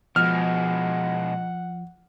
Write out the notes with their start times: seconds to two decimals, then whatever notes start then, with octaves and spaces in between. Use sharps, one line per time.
0.16 B2 F3 G#3 F#5 F6